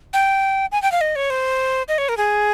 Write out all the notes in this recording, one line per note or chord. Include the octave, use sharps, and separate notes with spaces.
G5
G#5
G5
F5
D#5
C#5
C5
D#5
C#5
A#4
G#4